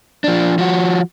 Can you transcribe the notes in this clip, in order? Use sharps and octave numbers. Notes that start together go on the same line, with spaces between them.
F3 D4
F3 F#4